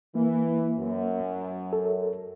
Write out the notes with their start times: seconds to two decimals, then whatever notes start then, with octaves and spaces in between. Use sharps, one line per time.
0.15 E3 A#3
0.77 F#2
1.73 A4